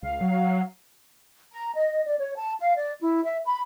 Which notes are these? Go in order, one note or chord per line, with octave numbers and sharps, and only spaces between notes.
C#2 F5
F#3
A#5
D#5
D5
C#5
A5
F5
D5
E4
E5
B5